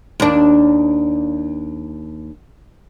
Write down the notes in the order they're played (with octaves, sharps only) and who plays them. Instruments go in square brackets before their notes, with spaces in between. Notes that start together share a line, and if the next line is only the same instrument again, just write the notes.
[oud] D#2 D4